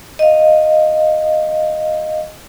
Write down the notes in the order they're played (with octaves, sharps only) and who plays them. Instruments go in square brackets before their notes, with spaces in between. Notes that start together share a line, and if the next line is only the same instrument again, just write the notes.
[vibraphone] D#5 F5